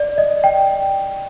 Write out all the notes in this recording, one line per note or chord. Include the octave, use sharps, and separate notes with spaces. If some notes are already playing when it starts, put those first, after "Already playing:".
Already playing: D5
D#5
G5